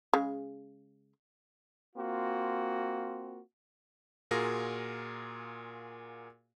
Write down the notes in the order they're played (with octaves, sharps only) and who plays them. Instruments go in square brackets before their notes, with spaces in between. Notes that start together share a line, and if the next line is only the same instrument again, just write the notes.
[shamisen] C#3 G#3
[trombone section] A#3 C4 F4 F#4
[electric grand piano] A#2 F4 F#4 G#4 A#4 A#6